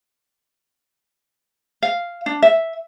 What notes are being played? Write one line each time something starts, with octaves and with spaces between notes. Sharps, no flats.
F5
D4
E5